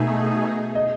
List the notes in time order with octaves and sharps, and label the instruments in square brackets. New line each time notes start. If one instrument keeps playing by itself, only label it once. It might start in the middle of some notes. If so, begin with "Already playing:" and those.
Already playing: [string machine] B2 A3 D#4 G#4 [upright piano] E5
[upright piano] D#5